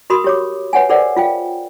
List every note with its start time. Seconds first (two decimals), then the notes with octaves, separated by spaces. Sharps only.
0.10 F#4 A#4 B5 C6 D#6
0.24 G4 C#5 D6
0.73 B4 C#5 F#5 G#5
0.89 G#4 A#4 C5 D5 F#5
1.16 F4 F5 G5